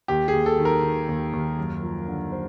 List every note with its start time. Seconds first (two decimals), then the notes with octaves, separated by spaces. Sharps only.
0.08 D#2 G4
0.28 G#4
0.33 D#2
0.46 A4
0.58 D#3
0.65 A#4
0.83 D#3
1.08 D#2
1.33 D#2
1.58 F#2
1.83 F3
2.08 D3
2.32 C5